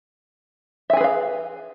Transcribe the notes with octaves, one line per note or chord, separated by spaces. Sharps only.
G#4 B4 E5 F5 G#5